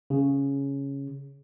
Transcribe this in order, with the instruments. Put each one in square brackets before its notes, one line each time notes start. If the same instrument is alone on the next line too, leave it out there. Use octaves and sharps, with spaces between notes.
[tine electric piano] C#3